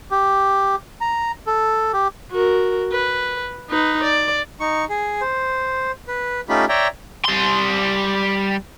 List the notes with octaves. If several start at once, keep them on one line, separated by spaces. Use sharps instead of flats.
G4
A#5
A4
G4
F#4 A#4
B4
D#4 B4
D5
D#4 C#6
G#4
C5
B4
A3 C#4 D#4 F4 G4 B5
C#5 D5 E5 G5 A#5
G3 C6